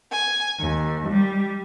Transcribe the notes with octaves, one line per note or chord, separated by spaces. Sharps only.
G#5
D#2
G3